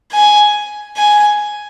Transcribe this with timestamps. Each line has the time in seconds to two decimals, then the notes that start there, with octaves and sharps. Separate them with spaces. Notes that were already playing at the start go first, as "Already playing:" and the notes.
0.13 G#5
0.97 G#5